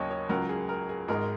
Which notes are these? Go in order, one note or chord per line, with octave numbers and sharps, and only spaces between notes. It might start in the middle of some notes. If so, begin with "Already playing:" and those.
Already playing: D#2 C#3 F#3 C#5 D#5
C#5
C#2 C#3 F#3 A#4
G#4
A#4
G#4
G#1 G#2 G#3 A#4